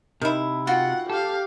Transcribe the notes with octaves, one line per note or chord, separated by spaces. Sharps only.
C3 D#3 E4
F4 F#4 F#5 G5
G4 A4 F5